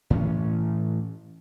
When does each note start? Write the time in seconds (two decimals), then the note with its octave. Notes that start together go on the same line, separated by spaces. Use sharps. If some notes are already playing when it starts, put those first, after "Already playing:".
0.10 A2 E3 C#4